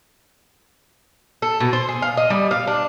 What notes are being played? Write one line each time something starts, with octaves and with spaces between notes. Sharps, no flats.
A4
B2
C5
G#4
F5
D#5
G3
F5
D4